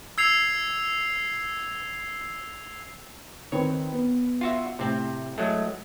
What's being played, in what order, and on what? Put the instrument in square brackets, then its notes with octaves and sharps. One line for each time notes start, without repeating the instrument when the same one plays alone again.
[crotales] E6 G#6 C7 F7
[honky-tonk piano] D#3 C4 B4 [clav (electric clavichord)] C#5
[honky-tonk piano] B3
[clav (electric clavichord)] F4 F#4 E5
[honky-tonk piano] A2 [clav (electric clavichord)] C3 C4
[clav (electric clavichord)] F#3 G#3 A3